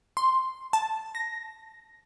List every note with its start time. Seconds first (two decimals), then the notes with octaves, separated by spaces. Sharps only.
0.17 C6
0.73 A5
1.15 A#6